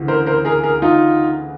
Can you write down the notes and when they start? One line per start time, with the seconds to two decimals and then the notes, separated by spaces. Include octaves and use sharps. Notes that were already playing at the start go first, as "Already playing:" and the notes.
Already playing: D2 C#3 E3
0.08 A#4 C5
0.26 A#4 C5
0.45 G#4 A#4
0.63 G#4 A#4
0.82 D#4 F4